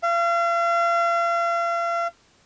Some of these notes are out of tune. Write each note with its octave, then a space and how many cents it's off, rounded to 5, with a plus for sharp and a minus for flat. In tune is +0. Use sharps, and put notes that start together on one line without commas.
F5 -40